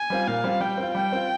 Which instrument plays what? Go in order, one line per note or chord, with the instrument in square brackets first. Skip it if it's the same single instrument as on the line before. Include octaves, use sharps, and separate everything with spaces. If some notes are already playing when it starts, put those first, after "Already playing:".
Already playing: [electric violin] G#5
[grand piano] G3 C4 F4
[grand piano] A#2 [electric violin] F5
[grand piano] G3 C4 F4
[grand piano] G3 [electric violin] G5
[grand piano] C4
F4
[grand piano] G3 [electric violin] G5
[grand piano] C4 F4